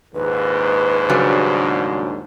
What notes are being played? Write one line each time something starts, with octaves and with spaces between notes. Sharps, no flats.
A#1 D#2 G#2 B4
C#3 F#3 G3 D4